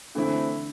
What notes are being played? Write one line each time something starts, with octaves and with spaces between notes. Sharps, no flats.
D3 E3 A3 C4 E4